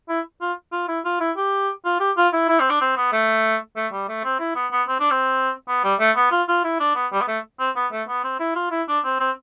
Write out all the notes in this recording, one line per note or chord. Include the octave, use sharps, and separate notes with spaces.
E4
F4
F4
E4
F4
E4
G4
F4
G4
F4
E4
E4
C4
D4
C4
B3
A3
A3
G3
A3
C4
E4
B3
B3
C4
D4
C4
B3
G3
A3
B3
F4
F4
E4
D4
B3
G3
B3
A3
C4
B3
A3
B3
C4
E4
F4
E4
D4
C4
C4